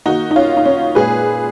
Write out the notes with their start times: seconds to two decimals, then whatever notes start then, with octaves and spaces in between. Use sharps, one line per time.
0.06 D#3 A#3 D#4 F#4
0.31 D#4
0.36 C#4 F4
0.57 D#4
0.65 C#4
0.95 A#2 G#3 G#4 B4